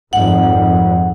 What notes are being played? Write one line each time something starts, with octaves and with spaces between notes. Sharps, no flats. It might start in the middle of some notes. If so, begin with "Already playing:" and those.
G#1 F2 G#2 F#5